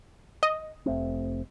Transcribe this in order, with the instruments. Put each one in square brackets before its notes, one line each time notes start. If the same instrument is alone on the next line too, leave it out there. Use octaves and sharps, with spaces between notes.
[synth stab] D#5
[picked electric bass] F1 A3 C4